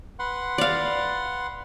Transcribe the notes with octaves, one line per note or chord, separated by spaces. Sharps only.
B4 F#5 C6
D5 F5